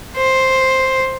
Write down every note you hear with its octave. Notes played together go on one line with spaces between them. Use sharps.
C5